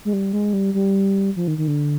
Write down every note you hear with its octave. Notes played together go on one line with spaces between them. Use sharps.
G#3
G3
G#3
G3
G3
F3
D#3
D#3
D3